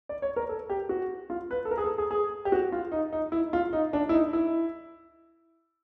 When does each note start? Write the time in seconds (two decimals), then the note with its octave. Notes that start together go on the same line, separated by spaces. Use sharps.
0.09 D5
0.22 C#5
0.36 A#4
0.49 A4
0.70 G4
0.89 F#4
1.30 F4
1.51 B4
1.65 A4
1.71 A#4
1.78 G#4
1.84 A4
1.98 G#4
2.11 G#4
2.45 G4
2.52 F#4
2.72 F4
2.92 D#4
3.13 D#4
3.32 E4
3.53 F4
3.73 D#4
3.93 D4
4.09 E4
4.13 D#4
4.33 E4